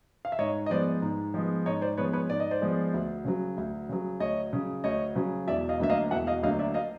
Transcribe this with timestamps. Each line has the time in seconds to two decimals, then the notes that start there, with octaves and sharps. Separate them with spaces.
0.25 F5
0.32 E5
0.38 G#2 C#5 D#5
0.66 D#5
0.70 F3 G#3 B3 C5 D5
1.02 G#2
1.34 F3 G#3 B3
1.66 G#2 C#5 D#5
1.82 C5 D5
1.97 F3 G#3 B3 B4 C#5
2.13 B4 C#5
2.29 G#2 D5
2.40 D#5
2.51 C5 D5
2.62 F3 G#3 B3
2.94 D2
3.25 C#3 F#3
3.57 D2
3.89 C#3 F#3
4.20 D2 C#5 D#5
4.53 C#3 F#3
4.84 D2 C#5 D#5
5.16 C#3 F#3
5.47 E1 D5 E5
5.69 D#5 F5
5.80 D2 D3 F#3 A#3 E5
5.90 D#5 F5
6.11 E1 E5 F#5
6.27 D#5 F5
6.43 D2 D3 F#3 A#3 D#5 F5
6.59 D5 E5
6.74 D#5 F5